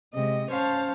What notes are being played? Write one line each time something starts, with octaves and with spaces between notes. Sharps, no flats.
C3 G#3 D#5
C#4 C5 C#5 F5 A5